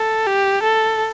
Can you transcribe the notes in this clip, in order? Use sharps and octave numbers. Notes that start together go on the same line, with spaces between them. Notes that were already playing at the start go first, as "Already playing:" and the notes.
Already playing: A4
G4
A4